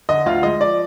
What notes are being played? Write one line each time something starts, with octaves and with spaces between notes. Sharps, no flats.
D3 D#5
D2 F4 F5
G#3 D#5
F3 D5